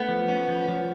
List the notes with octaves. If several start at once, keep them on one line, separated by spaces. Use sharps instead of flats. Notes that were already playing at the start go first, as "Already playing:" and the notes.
Already playing: A3 B3
F3
C#4
F3
F3